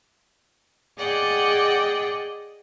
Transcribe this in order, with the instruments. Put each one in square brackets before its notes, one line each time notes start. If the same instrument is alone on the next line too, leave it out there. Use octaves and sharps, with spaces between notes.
[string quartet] G#4 D5 D#5 F#5 G5